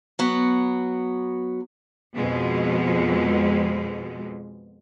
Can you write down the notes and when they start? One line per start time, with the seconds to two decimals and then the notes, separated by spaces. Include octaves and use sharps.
0.19 F#3 B3
2.15 F2 B2 G#3